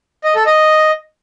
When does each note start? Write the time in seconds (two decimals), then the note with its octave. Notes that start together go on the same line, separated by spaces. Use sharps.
0.24 D#5
0.35 A4
0.46 D#5